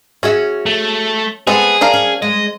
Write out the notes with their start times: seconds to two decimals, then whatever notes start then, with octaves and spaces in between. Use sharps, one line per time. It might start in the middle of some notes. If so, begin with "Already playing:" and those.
0.23 C#4 F#4 G#4 E5
0.66 A3
1.47 G#3 B3 C4 G#4 A4
1.81 D4 A#4 F5
1.94 C#4
2.22 G#3 D#5